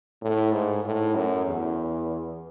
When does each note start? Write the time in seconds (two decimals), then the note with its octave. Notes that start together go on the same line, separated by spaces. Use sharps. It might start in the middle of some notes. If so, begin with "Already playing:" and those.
0.22 A2
0.53 G#2
0.84 A2
1.15 F#2
1.46 E2